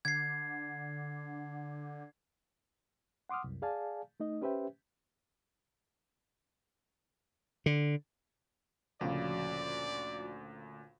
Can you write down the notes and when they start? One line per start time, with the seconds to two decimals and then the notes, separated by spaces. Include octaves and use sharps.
0.05 D3 G#6 C7
3.29 F#5 C6 D6 D#6 F6
3.44 C2 F#2
3.62 G#4 D5 F5 G#5 A5
4.20 A3 D#4 D#5
4.41 C#4 G4 B4 C5 E5 G5
7.66 D3
9.01 D2 A#2 C#3 F3 F4 F#4 D5